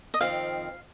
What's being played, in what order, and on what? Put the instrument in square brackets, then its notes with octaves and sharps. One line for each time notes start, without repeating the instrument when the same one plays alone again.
[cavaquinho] D#5
[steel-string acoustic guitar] F2 D#3 C4 [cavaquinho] F5